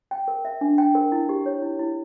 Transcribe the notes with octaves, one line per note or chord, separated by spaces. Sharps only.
G5
A#4
E5
D4
G5
A#4
E4
G4
C#5
E4
E4